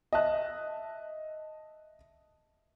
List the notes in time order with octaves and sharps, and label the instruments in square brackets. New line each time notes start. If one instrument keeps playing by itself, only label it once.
[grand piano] D#5 E5 A5 F#6